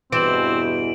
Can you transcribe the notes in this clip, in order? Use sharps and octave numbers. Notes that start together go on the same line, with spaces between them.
E2 G2 B2 E3 C4 D7 E7 F#7